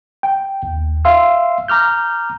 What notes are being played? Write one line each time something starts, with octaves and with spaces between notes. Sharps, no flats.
G5
D#2
E5 F5 C6 E6
A#5 D6 F6 G6